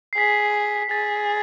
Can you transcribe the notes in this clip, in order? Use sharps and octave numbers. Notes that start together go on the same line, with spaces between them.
C7
G#4 B6
G#4 A6